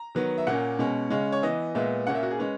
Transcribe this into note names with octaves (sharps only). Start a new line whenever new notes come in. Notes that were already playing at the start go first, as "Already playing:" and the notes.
Already playing: A#5
D#3 F#3 B3
E5
A#2 A#3 C#4 F#5
B2 G#3 C#4
C#3 G#3 C#4
C#5
E3 B3 D#5
A#2 G#3 B3 E5
A#2 A#3 C#4 F#5
E5
F#4
G#4
G#3 C#4 B4